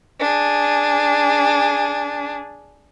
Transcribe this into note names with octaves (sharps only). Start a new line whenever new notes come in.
D4 G#4